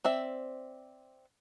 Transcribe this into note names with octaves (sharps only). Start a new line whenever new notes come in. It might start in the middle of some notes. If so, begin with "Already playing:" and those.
C4 D5 E5